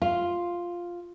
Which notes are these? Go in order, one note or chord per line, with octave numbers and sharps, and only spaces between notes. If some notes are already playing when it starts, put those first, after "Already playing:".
F4